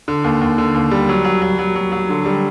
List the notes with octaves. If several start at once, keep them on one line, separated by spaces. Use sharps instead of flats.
D3
D#2
D#2
D3
D#2
G3
F#3
F#3
F#3
F#3
F#3
F#3
D3
G3